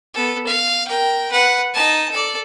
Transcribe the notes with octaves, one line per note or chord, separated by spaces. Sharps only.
B3 A4
F5
A#4 G5
B4 F#5
D#4 A5
A4 D5